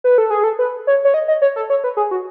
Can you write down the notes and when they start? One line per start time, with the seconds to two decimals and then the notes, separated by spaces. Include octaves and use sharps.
0.04 B4
0.18 A4
0.30 G#4
0.44 A4
0.59 B4
0.87 C#5
1.05 C#5
1.14 D#5
1.28 D#5
1.42 C#5
1.56 A4
1.70 C#5
1.84 B4
1.97 G#4
2.11 F#4